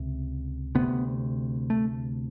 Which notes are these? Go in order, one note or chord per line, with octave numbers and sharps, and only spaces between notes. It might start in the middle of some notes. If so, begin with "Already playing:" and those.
Already playing: C#2 C3
D2 C3 B3
A3